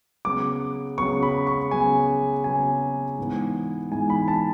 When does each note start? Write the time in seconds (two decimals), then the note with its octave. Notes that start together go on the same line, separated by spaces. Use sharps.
0.25 C#3 F#3 B3 D6
0.98 C#3 F#3 B3 C#6
1.23 B5
1.47 C#6
1.71 C#3 F#3 B3 G#5
2.44 C#3 F#3 B3 G#5
3.18 G#2 E3 B3
3.91 G#2 E3 B3 G#5
4.10 B5
4.28 A5